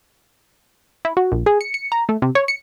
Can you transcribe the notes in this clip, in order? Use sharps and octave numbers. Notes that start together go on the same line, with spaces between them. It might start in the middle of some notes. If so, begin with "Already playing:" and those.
E4
F#4
A#1
G#4
C#7
C#7
A#5
A3
C3
C#5
C#7